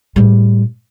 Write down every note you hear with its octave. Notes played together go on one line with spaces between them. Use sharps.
A2 G3